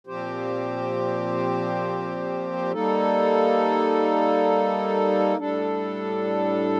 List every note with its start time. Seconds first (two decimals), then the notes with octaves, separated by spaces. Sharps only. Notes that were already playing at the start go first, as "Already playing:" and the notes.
0.07 A#2 F3 C4 G4 C5
2.72 G3 A#3 D#4 A4
5.38 A2 G3 D4 A4